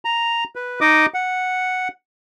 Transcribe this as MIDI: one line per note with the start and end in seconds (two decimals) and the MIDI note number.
0.05 0.44 82
0.56 0.80 71
0.81 1.06 63
0.81 1.06 75
0.81 1.06 86
0.81 1.06 87
1.14 1.88 78